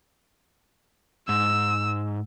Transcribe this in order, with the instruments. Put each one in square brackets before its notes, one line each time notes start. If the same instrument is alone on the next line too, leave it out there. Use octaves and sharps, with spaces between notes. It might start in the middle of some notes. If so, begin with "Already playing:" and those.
[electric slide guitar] G#2 [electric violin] E6